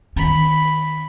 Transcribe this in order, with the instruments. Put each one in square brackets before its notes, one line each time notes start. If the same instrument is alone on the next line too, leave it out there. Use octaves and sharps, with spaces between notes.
[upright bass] D#3 C#4 [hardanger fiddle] B5